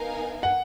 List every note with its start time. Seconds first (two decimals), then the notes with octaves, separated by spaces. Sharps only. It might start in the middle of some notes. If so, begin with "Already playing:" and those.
Already playing: B3 D#4 A#4 F5 G#5
0.43 F#5